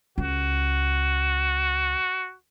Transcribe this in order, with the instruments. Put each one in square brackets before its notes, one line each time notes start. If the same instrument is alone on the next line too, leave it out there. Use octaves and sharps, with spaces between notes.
[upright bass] C#2 [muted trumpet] F#4